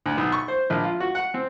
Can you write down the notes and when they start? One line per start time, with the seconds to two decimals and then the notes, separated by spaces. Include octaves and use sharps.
0.06 D2
0.17 B1
0.32 C#6
0.48 C5
0.70 A#1
0.84 F4
1.00 F#4
1.15 F#5
1.34 C4